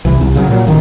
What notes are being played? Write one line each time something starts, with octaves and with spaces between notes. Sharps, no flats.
C2 C3 E3
C2
C#3 E3 F#3
A#2 F#3
A1 D#3